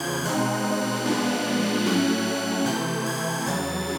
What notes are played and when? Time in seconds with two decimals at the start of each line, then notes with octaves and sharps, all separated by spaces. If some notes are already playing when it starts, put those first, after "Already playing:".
Already playing: E2 C#3 F3 G6 G#6
0.25 B2 G#3 C4 D#4 F#6
1.05 A#2 F3 G#3 B3 D4
1.86 A2 F#3 A3 C#4 F#6
2.65 C3 E3 A3 G6
3.06 G#6
3.46 E2 C#3 F#3 A6